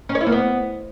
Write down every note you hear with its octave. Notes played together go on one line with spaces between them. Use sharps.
C#4
C#5
E4
A#3
B3